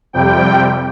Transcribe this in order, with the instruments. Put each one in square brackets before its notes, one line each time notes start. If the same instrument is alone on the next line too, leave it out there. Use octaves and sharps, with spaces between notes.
[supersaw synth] F2 C3 G3 G5